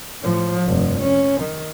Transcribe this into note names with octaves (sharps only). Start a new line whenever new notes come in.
A2 F3
F1 G2
C#4
D#3